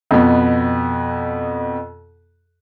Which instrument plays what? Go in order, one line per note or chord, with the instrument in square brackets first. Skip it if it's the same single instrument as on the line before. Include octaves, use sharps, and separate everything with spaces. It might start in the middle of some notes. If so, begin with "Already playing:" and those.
[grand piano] F2 B2 B3